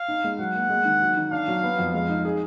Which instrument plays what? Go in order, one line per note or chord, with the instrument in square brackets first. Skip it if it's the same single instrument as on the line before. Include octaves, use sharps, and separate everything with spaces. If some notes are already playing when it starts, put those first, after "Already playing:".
Already playing: [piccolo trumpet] F5
[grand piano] D#4
G#3
[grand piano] F#3 [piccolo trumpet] F#5
[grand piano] A#3
G#3
D#3
F#3
D#3
[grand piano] D4 [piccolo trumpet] F5
[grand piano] F#3
B3
F2
[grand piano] G#3 [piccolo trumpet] F5
[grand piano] D#4
G#4